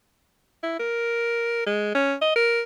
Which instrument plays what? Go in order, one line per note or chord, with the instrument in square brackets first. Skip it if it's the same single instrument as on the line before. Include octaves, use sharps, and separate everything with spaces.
[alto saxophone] E4
A#4
G#3
C#4
D#5
A#4